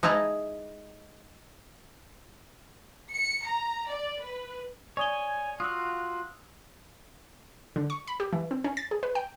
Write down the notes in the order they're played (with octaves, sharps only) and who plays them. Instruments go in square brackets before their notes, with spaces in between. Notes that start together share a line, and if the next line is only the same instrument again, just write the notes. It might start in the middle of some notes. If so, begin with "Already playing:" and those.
[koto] G#3 D#4 E4 A5 A#5
[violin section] C#7
A#5
D5
B4
[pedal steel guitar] C#5 [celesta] D5 D#6 G7 [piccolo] G#5
[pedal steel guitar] F4 F#4 [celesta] D#6 E6 [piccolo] F#6
[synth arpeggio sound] D3
C#6
B5
G4
E3
C4
C#4
A6
G#4
B4
G5